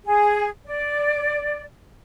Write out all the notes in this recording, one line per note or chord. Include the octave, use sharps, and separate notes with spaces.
G#4
D5